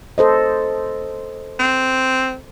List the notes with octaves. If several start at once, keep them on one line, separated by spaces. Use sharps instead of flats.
A4 C5 D#5
C4